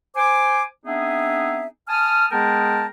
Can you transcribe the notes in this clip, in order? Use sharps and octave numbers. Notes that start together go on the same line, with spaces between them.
C5 G#5 D6
B3 C4 D4 D#4 G#4 E5
G#5 A5 D#6 F6
G#3 B3 G#4 A#4 G5 A5